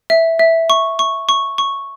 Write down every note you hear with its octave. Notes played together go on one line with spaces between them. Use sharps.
E5
E5
C#6
C#6
C#6
C#6